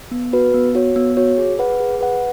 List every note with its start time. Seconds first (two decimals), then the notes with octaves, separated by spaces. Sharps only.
0.11 B3
0.33 F#4 B4
0.54 B3
0.75 F#4 C#5
0.96 B3
1.17 F#4 C#5
1.38 G#4
1.59 B4 F#5
1.80 G#4
2.01 B4 F#5